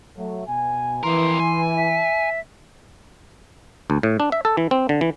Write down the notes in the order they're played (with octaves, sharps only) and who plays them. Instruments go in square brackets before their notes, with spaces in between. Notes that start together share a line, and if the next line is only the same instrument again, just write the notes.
[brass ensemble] F#3 A3
B2 G#5
[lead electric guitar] F2 A#4 [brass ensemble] E3 [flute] C6
[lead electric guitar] G#5
[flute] E5
[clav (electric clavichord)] D2
A2
D4
E5
A4
E3
C4
D3
E3